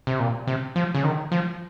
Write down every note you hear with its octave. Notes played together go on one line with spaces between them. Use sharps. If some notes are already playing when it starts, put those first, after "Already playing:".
C3
A#2
C3
F3
C#3
D#3
F3